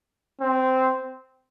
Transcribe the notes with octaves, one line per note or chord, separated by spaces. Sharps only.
C4